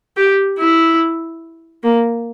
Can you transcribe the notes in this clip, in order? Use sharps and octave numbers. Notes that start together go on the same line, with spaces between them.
G4
E4
A#3